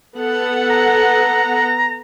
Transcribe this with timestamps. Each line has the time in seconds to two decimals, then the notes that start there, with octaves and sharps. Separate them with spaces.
0.16 B3 A4 F#5
0.70 A#5